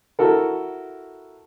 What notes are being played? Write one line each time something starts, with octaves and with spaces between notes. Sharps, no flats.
E4 F#4 A4 A#4